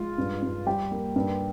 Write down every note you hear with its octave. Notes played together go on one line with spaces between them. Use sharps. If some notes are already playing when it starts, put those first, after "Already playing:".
Already playing: G#3 F4
G2
G2
G3 G4
A#3
G2